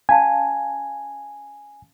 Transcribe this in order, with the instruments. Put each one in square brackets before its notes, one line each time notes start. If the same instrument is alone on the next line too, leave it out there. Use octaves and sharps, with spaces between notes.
[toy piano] C#4 F5 A5 [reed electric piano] G#5